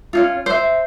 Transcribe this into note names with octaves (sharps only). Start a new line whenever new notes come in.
C#4 D#4 F4
C5 E5